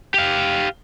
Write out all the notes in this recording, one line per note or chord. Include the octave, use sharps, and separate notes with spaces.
G4 F5